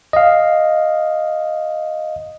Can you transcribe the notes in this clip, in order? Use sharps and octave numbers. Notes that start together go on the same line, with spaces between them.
D#5 F5